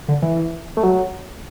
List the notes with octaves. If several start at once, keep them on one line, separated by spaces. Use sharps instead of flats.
D3
E3
A3
F#3